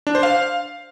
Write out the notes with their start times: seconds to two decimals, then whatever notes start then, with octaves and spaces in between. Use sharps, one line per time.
0.07 D4
0.15 C5
0.23 F5